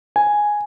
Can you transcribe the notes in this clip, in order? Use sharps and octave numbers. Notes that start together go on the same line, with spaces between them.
G#5